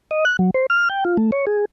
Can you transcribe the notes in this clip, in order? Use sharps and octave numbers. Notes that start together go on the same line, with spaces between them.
D#5
F#6
F#3
C5
F6
G5
F4
A3
C#5
G#4